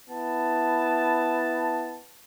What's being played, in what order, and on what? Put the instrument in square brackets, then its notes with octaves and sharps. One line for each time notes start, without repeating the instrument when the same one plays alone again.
[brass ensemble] B3 E4 A5